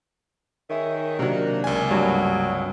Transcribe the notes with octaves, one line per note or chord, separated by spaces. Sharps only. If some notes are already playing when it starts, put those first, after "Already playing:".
D#3 G#4 C#5 E5
C3 F#3 A#3 D4
C#2 G#5
G2 F#3